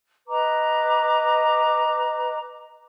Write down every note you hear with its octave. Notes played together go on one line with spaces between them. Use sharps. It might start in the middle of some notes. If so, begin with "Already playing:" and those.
B4 D#5 A#5 D6